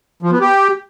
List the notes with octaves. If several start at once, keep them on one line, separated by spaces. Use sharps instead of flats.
F3
B3
G4